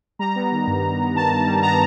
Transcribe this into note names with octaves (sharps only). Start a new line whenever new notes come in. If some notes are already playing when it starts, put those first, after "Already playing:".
G3 A#5
B3
D#3
G2
G3
B3
D#3 A5
G2
G3
B3 A#5